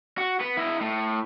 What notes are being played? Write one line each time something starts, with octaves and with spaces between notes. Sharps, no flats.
F#4
B3 B4
E4 D#5
A2